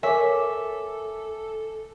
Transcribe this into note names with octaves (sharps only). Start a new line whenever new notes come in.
A4 A#4 C#5 E5 G#5 C#6 D6